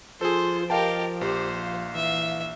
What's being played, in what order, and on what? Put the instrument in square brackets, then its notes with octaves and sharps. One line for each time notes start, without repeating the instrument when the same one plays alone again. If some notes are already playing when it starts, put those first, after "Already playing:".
[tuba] F3 [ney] F4 [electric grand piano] G#4 A4 [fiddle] C5
[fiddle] G4 A#4 [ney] D#5 [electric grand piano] F5 G5 A5
[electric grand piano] A#1 [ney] G4 [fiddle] C5
[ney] F5
[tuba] E3 [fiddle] E5